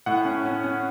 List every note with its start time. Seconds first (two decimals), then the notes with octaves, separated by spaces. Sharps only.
0.06 A2 F#5
0.25 C#4
0.45 C#4
0.64 C#4